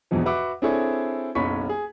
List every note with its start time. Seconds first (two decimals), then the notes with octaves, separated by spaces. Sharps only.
0.11 A#1 E2 G#2 B2 E3 F3
0.26 F#4 B4 E5 F#5 D6
0.62 C4 D4 E4 G#4 A4 C#5
1.35 F#1 B1 C#4 B5 C#6 B6
1.69 G#4